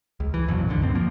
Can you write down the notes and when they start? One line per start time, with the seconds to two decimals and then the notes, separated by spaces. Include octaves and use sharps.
0.20 C#2
0.34 E3
0.47 B1 F2 A#2 F#3
0.67 A#1 F2 D3
0.82 D2 G2 F3 C4
0.95 F3 A#3